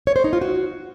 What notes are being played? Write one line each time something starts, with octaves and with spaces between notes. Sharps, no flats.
C#5
C5
D#4
F4
F#4